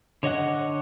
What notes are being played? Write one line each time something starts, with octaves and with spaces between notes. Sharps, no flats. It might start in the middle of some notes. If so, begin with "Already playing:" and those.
D3 C#5 D#5 F#5 F#6